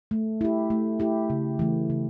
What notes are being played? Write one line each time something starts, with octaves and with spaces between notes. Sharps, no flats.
A3
E4 G4
A3
E4 G4
C#3
E3 A3
C#3